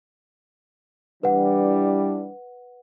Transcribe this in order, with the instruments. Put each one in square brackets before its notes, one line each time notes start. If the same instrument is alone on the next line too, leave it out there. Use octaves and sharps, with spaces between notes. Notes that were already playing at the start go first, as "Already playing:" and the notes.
[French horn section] E3 G3 D4 [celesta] B4 F#5